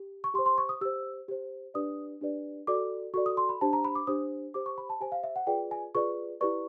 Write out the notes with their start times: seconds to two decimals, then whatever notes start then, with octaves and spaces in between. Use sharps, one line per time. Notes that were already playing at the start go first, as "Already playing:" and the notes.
Already playing: G4
0.24 C#6
0.34 G4 C6
0.39 C5
0.46 C6
0.58 C#6
0.69 D#6
0.81 G4 C5 E6
1.28 G4 C5
1.74 D4 G4 B4 D5 D#6
2.21 D4 G4 B4 D5
2.67 F#4 A4 D5 D6
3.14 F#4 A4 D5 C#6
3.26 D#6
3.37 C6
3.49 B5
3.61 D4 G4 C5 A5
3.73 A#5
3.85 B5
3.95 D6
4.07 D4 G4 C5 D#6
4.54 G4 C5 D6
4.66 C#6
4.78 B5
4.89 A5
5.00 G4 C5 G#5
5.12 F5
5.23 E5
5.36 F#5
5.47 F4 G#4 B4 D5 G5
5.71 G#5
5.95 F4 G#4 B4 D5 C#6
6.41 E4 G4 B4 D5 C#6